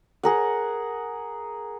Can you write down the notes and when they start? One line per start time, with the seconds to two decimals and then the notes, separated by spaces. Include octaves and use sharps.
0.23 G#4 A#4 F#5